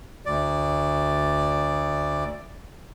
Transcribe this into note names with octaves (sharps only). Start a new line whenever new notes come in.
D2 D5